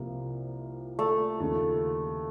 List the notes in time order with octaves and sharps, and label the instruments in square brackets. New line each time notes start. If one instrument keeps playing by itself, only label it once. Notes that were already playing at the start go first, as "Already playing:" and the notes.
Already playing: [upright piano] C2 C3 F3 A#3
[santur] A3
[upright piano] D#2 C#3 F3